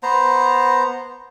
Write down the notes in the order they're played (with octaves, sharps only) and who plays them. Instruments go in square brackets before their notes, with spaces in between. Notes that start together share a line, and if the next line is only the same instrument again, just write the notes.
[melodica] B3 C5 A#5